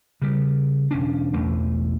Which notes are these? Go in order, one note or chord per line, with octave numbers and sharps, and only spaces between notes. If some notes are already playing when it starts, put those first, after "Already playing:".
C#3 G3
E1 C#4 D4
E1 A1 E2 A3